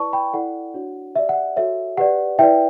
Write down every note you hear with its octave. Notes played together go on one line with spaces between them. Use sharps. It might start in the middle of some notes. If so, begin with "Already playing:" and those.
Already playing: E4 B4 D5 A5 C#6
G5 B5
E4 A4 D5 F#5
D4 F#4 C#5
G4 D5 E5
F#5
F#4 A4 C#5 E5
G4 B4 D5 F#5
E4 B4 D5 E5 G5